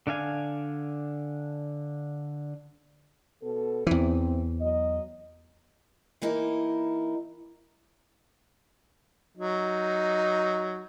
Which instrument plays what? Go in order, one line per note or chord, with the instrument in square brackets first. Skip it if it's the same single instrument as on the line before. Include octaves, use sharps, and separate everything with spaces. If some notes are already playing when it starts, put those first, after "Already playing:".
[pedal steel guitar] D3 D4 F5 G#5
[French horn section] B2 B3 A4
[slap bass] E2 E3 [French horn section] C4
[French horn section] F#3 D#5
[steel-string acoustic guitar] E3 A#3 D#4 E4
[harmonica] F#3 D#4